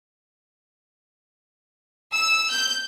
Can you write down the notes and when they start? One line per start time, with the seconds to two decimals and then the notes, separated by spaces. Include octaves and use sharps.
2.13 E6
2.50 G6